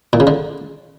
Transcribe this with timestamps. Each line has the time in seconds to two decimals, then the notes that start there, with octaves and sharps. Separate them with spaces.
0.13 A#2
0.20 C#3
0.27 D3